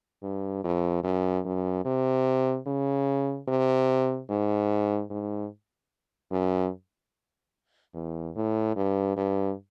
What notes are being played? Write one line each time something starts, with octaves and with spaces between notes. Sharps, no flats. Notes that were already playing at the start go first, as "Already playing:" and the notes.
G2
F2
F#2
F#2
C3
C#3
C3
G#2
G#2
F#2
E2
A2
G2
G2